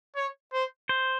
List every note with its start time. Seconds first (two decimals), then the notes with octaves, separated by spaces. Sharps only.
0.16 C#5
0.53 C5
0.89 C5